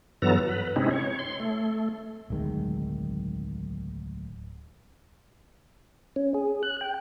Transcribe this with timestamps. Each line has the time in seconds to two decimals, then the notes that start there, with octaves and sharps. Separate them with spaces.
0.22 G2 E3 F#3 B3 A4 A#5
0.48 B4
0.76 C3 G#3 C4 C#4 D#4 E4
0.91 C#5
1.19 C6
1.40 A3
2.30 D1 B1 D#3 G#3
6.16 C#4
6.34 G#4
6.63 F#6
6.81 G5